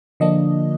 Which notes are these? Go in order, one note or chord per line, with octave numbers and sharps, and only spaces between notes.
D3 F3 A#3 D4 D#5